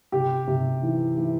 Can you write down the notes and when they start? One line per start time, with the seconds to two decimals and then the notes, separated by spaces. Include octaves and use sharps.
0.12 C3 G4
0.47 C3
0.83 E3
1.18 E3